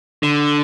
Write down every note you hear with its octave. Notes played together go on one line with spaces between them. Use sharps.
D3